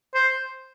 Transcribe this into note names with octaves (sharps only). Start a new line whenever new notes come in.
C5